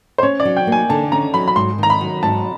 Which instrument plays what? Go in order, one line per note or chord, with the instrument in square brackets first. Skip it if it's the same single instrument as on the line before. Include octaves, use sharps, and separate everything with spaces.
[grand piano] C5
[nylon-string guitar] C#4 [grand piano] C#5
[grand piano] D5
[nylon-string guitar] F#3
[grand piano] G5
[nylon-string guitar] A#3
[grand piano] G#5
[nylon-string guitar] D3 [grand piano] A5
[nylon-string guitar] C#4 [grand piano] A#5
[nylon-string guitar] F#3 [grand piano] B5
[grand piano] B5
[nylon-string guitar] G#2 [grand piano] C6
[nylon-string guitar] D#3 [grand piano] A#5
[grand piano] B5
[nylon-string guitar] F#3
[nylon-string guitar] G#2 [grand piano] A5